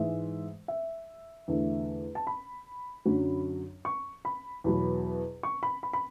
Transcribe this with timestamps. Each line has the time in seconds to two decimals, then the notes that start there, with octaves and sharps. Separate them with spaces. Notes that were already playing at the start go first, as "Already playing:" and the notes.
Already playing: G#2 E3 G#3 E5
0.68 E5
1.48 E2 D3 A3
2.15 A5
2.27 B5
3.06 F#2 D3 F#3
3.85 C#6
4.25 B5
4.64 E2 B2 F#3
5.43 C#6
5.63 B5
5.83 B5
5.93 B5